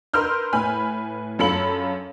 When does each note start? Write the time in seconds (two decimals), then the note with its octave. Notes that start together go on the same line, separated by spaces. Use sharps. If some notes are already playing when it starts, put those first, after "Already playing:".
0.14 A#4 B4 C6 E6 F6 G6
0.53 A2 B4 G#5 B5 F6
1.39 F#2 F4 A4 B5 C#7 F#7